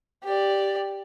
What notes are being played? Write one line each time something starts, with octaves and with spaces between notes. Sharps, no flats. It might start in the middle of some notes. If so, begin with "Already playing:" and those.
G4 D5